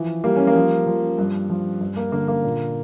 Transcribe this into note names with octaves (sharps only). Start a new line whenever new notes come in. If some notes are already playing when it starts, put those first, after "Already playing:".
Already playing: E3 F3
G3 A#3
C#4
A#3
F3
F3
G2
F3
G2
A#3
D3 A#3
A#3
A#2